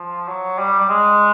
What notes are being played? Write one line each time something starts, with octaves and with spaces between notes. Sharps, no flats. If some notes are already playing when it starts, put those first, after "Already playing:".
Already playing: F3
F#3
G3
G3
G#3